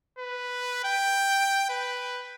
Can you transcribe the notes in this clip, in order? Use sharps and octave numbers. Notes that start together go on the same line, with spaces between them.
B4
G5
B4